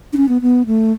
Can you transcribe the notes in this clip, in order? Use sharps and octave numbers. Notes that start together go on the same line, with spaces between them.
D4
C#4
B3
B3
A3